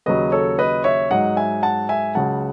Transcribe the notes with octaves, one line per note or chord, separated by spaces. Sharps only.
D#2 C#3 F#3 B4 D#5
A4 C#5
B4 D#5
C#5 E5
G#2 F#3 D#5 F#5
E5 G#5
F#5 A5
E5 G#5
C#2 C#3 F#3 F#5 A5